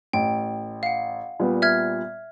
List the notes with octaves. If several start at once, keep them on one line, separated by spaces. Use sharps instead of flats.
A1 G5
F5 F#5
A#2 G3 B3
E5 F6 G#6